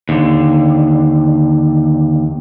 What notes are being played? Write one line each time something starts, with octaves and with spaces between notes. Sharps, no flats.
D#2 D3